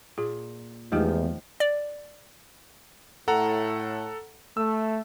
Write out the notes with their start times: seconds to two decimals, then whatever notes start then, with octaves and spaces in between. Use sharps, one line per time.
0.18 A#2 G#4
0.92 E2 D#3 F3 G#3 A3 G4
1.60 D5
3.28 A2 A4 F#5 A#5
4.57 A3 E6